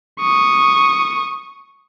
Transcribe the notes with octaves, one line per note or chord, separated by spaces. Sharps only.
C#6 D#6